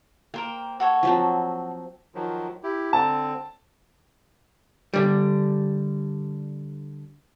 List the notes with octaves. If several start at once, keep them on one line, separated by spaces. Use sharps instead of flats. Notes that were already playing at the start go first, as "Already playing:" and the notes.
A#3 A#4 C5 G5
F#4 A4 C#5
F3 F#3 C4
D#3 F3 F#3
E4 G4
D3 C4 A5
D3 G3